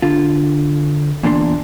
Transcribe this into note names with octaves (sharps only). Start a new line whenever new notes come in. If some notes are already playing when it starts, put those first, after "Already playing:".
D3 F4
E2 A#2 D4 A4 C6